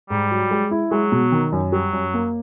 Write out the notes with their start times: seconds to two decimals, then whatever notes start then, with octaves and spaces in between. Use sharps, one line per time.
0.10 G#2 G3
0.31 F#3
0.51 G#3
0.71 E4
0.91 F#3 G#3
1.12 B2
1.32 D#3
1.52 F#2
1.72 F#3 G3
1.93 F#2
2.14 A#3